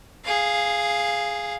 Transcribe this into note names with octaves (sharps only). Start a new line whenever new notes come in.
G#4 F5